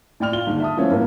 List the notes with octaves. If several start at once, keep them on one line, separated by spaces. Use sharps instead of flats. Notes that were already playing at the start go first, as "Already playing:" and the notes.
A2 D5 G5 F6 F7
F4 G7
D#2 G#2 D3
E5 A5 D#6
E3 F3 A3 B3 C#4
A#1 A2 A#3 B3